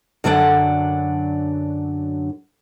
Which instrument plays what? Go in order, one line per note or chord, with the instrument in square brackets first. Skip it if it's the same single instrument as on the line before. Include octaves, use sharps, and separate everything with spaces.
[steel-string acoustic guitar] F#2 D3 F#3 D4 F#5